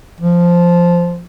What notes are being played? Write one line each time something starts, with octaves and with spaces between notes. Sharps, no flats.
F3